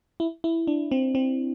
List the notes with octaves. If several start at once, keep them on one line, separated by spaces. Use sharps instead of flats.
E4
E4
D4
C4
C4